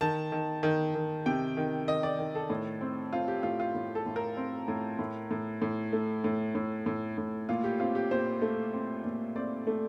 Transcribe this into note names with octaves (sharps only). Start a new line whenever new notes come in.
D#3 A5
D#3
D#3
D#3
C3 G5
D#3
D#3 D#5
D5
D#3
A4
A2
C4
C4 F4
G4
A2 F4
F4
A2
A4
A2
A#4
C4
A2
A2
A2
A2
A3
A2
A2
A2
A2
A#2 F4
G4
C4 F4
G4
A#2 C5
A3
C4
A#2
C4 D5
A3